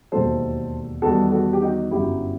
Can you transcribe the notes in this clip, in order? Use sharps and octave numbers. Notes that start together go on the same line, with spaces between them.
E1 D#2 D#3 F#3 A4 C5
E2 D#3 G3 F#4 A4
F#4 A4
G4
D#4 F#4
G1 F#2 F#3 E4 G4